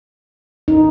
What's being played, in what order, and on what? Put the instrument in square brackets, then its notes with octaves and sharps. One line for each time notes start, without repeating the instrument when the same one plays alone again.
[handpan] D#4